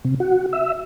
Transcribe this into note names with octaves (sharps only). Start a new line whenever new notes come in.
C3
F#4
E5